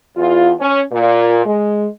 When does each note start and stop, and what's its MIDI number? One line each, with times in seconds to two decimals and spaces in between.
0.17 0.53 40
0.17 0.53 65
0.60 0.80 61
0.92 1.44 46
1.46 1.87 56